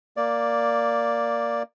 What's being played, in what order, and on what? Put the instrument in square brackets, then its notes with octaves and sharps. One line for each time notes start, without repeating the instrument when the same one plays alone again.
[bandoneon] A#3 D5